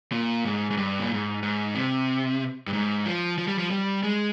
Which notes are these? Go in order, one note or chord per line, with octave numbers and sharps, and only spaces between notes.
A#2
G#2
G#2
G2
A#2
G#2
G#2
C3
G2
G#2
F3
F3
G3
F3
G3
G#3